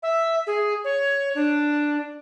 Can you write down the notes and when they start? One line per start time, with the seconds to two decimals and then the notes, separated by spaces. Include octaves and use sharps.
0.03 E5
0.47 G#4
0.84 C#5
1.35 D4